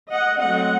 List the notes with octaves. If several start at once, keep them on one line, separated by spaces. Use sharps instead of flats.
D#5 F#5
F#3 A3 C4 D#5 F#5